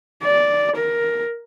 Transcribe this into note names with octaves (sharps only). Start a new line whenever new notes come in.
D5
A#4